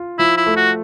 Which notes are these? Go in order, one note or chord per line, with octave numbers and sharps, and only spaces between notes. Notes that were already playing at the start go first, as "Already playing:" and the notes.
Already playing: F4
F3 E4
E4
A3
F#4